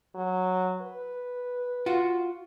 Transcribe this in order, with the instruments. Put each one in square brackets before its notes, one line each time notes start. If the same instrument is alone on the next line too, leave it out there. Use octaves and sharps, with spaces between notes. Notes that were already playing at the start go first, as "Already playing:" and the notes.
[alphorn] F#3
B4
[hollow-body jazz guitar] F4 F#4